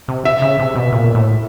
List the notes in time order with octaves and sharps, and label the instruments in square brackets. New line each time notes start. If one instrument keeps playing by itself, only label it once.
[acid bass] C3
[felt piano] E5
[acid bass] C#3
C3
B2
A#2
A2